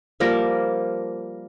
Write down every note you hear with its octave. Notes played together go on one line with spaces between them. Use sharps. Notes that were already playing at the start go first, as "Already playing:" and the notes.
F3 G3 A#3 A#4